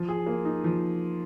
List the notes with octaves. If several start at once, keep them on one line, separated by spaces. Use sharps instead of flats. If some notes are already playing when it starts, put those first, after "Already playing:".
Already playing: F3
G#4
A#3
D#4
F3